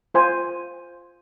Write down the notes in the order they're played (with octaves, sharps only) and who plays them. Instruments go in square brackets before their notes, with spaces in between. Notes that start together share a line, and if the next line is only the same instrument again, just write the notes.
[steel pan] F4 C5 G#5